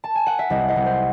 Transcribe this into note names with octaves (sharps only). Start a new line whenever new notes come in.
A5
G#5
F#5
E5
C2 D#5
D#5
C2
C5